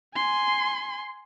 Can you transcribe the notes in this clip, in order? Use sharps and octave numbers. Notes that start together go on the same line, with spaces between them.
G#5 C6